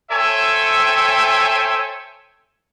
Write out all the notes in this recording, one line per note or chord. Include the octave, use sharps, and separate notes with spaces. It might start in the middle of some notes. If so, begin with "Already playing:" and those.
A4 C5 C#5 E5 G5 G#5